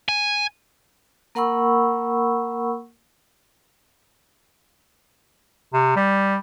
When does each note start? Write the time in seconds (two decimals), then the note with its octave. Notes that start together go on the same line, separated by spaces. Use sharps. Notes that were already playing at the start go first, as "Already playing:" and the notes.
0.09 G#5
1.35 A#3 A#4 F#5 B5 C#6 E6
5.73 C3
5.96 G3